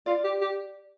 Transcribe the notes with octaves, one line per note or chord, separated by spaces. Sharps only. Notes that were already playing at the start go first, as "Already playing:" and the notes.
F4 D5
G4
G4